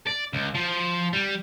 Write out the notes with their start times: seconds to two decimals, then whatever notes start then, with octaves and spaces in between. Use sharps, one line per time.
0.07 D5
0.33 C#2
0.55 F3
1.13 G3